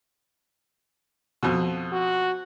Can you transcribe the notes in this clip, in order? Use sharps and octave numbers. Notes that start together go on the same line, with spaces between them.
F2 B2
F#4